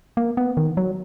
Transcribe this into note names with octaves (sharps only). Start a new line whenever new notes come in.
A#3
B3
D#3
F#3